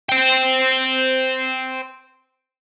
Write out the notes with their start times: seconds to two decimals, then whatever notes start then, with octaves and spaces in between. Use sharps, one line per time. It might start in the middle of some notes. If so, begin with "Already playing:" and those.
0.09 C5 G5